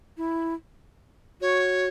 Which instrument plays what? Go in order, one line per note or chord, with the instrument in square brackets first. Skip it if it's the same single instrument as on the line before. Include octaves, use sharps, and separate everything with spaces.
[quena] E4
[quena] F#4 [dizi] C#5